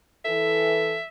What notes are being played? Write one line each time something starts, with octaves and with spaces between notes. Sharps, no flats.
E3 A4 E5